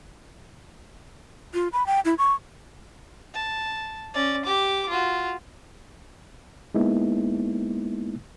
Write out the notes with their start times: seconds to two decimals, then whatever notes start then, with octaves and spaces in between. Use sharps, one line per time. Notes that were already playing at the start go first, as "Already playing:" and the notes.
1.54 F4
1.73 B5
1.86 G5
2.05 E4
2.18 C#6
3.34 A5
4.14 C#4 D5
4.45 G4 D6
4.89 F4 F#4
6.74 G#3 A#3 B3 D#4 E4